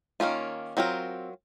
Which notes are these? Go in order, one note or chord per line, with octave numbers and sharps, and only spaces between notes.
D#3 A#3 C#4 F4
F#3 C4 F4 A#4